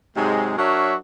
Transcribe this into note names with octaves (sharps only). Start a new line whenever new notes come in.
G#2 C3 F#3 G#3
F#3 D4 F#4 A#4 C#5 E5